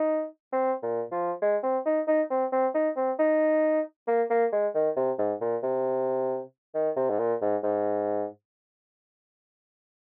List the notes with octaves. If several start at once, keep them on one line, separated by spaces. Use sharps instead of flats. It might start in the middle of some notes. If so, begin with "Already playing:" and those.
Already playing: D#4
C4
A#2
F3
G#3
C4
D#4
D#4
C4
C4
D#4
C4
D#4
A#3
A#3
G#3
D#3
C3
G#2
A#2
C3
D#3
C3
G#2
A#2
G#2
G#2